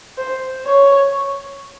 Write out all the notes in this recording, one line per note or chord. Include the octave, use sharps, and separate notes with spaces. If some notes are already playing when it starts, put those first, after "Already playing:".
C5
C#5